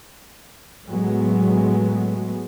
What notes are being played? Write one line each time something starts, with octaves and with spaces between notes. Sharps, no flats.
A2 F#3 G#3 B3